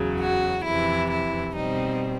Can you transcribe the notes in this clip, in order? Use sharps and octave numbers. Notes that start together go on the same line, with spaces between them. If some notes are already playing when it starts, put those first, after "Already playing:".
Already playing: E2 C#3 F#3
F#4
F2 C3 E3 E4
E4
B2 G3 C4 D#4